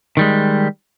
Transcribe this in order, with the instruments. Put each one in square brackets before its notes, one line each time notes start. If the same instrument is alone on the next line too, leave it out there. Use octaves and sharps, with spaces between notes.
[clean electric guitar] D#3 G3 G#3